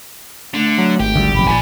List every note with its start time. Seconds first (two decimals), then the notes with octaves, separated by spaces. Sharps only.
0.54 D3 A3
0.78 F#3
1.00 G#1 G4
1.16 D2 G3
1.35 F1 A#1 F#2 B5
1.48 A#1 D5 G#5